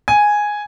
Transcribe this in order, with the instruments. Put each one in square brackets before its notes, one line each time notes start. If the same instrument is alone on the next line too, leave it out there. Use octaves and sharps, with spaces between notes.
[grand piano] G#5